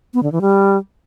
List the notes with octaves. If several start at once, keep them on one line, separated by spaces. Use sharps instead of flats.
B3
D3
E3
G3